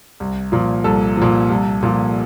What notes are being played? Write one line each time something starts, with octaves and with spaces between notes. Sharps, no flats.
C2
A#2 F3
C2 A4
A#2 F3
C2
A#2 F3